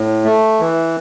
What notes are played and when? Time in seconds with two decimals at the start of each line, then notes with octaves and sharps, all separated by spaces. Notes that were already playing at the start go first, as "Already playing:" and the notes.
Already playing: A2
0.24 A3
0.60 E3